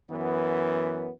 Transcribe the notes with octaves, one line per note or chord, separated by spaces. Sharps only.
F#2 E3 B3